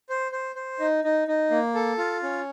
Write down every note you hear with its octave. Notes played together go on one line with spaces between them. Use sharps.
C5
C5
C5
D#4
D#4
D#4
A#3
A4
F4
C#4